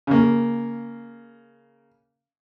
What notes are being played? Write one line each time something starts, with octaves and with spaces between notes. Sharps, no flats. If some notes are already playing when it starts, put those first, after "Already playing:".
C#3 A#3